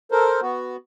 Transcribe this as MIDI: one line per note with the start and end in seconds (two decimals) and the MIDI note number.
0.11 0.40 69
0.11 0.40 70
0.11 0.40 72
0.42 0.76 59
0.42 0.76 66